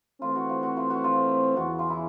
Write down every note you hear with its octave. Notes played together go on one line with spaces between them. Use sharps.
E3 A3 C4 F4
F#4
F4
F#4
F4
F#4
F4
E2 C#3 E3 F#4
F4
E4